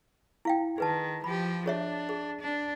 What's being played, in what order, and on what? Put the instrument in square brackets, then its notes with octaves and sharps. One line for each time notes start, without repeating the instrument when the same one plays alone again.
[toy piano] E4 F5 G5
[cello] D#3 [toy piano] G#4 B4 A5
[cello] F3 G4 [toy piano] B5
[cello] D4 [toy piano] G#4 C#5 E5
[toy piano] G#4
[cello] D4